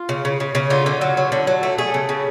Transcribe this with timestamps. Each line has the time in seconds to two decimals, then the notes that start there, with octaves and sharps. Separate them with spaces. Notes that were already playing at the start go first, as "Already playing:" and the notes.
Already playing: F4
0.09 C#3
0.25 C#3
0.40 C#3
0.55 C#3
0.70 D3 F4
0.86 D3
1.01 F#3
1.17 F#3
1.32 D3
1.47 F#3
1.63 A3
1.78 A3 G#4
1.94 C#3
2.09 C#3